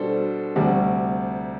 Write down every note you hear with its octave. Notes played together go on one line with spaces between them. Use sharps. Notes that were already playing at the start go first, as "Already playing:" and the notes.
Already playing: B2 G3 D4 A4 C5
D2 C3 G3